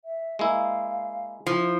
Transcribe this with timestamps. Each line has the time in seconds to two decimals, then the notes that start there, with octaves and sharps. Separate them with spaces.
0.05 E5
0.39 G#3 A#3 E4 F5
1.47 F3 E4